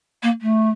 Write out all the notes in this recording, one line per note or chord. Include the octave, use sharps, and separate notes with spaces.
A#3
A3